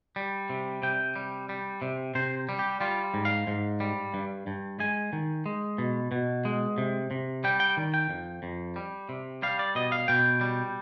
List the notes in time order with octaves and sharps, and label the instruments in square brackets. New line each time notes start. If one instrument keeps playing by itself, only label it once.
[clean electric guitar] G3
C3
C3 G5
G3
G3
C3
C3 C5
G3
G4
G3 F4
G#2
F5
G#2
G3
G2
G2
G#3 G#5
D#3
G#3
B2
B2
G#3
C3
C3
G3 G5
G5
D#3
G5
F2
F2
G3
C3
G3 F5
D5
B2 D#5
F5
B2 G5
G3